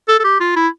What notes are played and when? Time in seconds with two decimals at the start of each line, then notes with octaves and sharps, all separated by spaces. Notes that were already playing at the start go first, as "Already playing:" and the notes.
0.08 A4
0.19 A4
0.24 G4
0.40 F4
0.56 E4